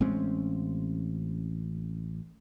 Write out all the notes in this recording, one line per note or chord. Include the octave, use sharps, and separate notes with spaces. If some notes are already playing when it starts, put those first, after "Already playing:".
A1 G#3 C4 C#4